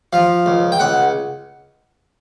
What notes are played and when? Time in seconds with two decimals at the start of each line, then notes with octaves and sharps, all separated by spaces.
0.13 F3 F5
0.46 C#2
0.72 G5
0.79 C#2 F#5